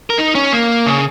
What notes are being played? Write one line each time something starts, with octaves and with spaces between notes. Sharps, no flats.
A#4
D#4
C#4
A#3
C#3